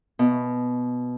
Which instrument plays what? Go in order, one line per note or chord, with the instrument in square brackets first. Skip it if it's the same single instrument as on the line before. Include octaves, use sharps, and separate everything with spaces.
[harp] B2